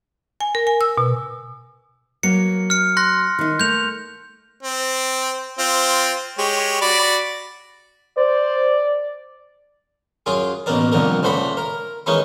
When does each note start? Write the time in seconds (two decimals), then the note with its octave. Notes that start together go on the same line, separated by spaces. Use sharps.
0.41 G#5
0.55 A#4
0.67 G#5
0.81 E6
0.98 B2
2.23 F#3 A#3 C#7
2.70 F6 C#7
2.97 C6 F#6 A#6
3.39 D#3 D#4
3.59 A3 A#3 G6 F7
4.63 C4
5.59 C4 F4
6.38 G#3 G4 C#5
6.81 F#4 D5 B5
8.17 C5 D5
10.26 F#2 F4 G#4 D6
10.66 A1 B2 A#3 A#4 D5
10.92 C2 F2 A#2 D3 F3 A#4
11.23 C#2 A#2 A3 C5 F#5 B5
11.57 A#4
12.06 D#3 E3 G#3 C#4 D#4 E4